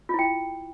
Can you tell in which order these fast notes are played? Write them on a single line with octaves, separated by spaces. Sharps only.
F4 E4 G5